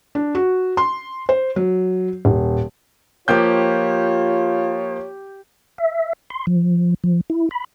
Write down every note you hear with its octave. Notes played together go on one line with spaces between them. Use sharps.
D4
F#4
C6
C5
F#3
D#1
F3 A#3 F4 G4 C#5 G5 G6
E5
C6
F3
F3
E4
B5